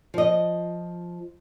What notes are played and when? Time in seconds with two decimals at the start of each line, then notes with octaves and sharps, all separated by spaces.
0.14 F3 D#5